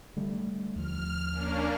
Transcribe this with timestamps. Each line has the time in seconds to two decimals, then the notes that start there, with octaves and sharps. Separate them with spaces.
0.16 D3 G3 A3
0.75 D#2 F3 F6
1.32 A#3 C#4 D4